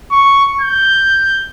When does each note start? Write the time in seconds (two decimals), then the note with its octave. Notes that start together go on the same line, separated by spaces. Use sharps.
0.11 C#6
0.61 G6